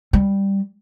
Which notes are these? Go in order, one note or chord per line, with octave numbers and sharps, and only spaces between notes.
G3